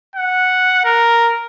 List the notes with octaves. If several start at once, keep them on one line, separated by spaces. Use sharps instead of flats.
F#5
A#4